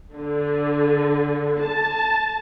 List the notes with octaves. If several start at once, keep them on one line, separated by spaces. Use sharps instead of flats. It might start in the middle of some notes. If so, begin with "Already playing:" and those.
D3
A5